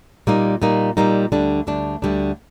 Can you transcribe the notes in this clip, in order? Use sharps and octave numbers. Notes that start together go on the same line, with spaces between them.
A#2 G3 A#3 D#4
A#2 G3 A#3 D#4
A#2 G3 A#3 D#4
D2 D3 G3 D4
D2 D3 G3 D4
D2 D3 G3 D4